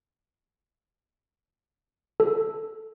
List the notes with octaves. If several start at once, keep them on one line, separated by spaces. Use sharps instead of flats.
A4